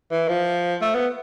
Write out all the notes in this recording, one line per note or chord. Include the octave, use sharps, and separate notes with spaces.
E3
F3
A3
B3